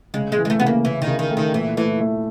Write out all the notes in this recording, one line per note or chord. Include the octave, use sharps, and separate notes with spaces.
C#3 G#3
G#3
E3
G#3
A3
C#3 B3
A#3
C#3 E3
D#3
C#3
D#3
A3
D#3
A#2 E3
E3 A3
A3